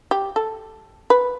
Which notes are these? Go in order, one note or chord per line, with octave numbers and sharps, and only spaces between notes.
G4
A4
B4